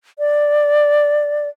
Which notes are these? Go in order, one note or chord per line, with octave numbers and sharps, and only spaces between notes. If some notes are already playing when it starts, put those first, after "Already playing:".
D5